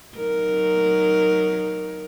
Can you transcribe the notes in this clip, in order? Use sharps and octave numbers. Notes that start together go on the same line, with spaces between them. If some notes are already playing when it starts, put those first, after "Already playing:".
F#3 D#4 A#4